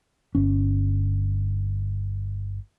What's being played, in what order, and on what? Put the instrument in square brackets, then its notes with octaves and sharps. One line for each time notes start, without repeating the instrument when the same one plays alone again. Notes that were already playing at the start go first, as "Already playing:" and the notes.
[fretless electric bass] G1 C#4